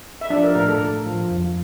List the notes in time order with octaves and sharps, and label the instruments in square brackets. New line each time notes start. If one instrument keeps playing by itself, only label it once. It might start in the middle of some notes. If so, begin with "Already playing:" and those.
[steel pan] E5
[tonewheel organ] F3 [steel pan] D4 D5
[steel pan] A#4
[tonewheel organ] A2 [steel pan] A#4
[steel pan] A4
[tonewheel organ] A2
F3
F2